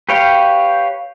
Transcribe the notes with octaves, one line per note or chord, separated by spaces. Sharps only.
G4 B4 C#5 F5 G5